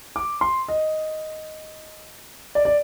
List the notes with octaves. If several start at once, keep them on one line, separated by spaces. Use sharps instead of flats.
D6
C6
D#5
D5
D5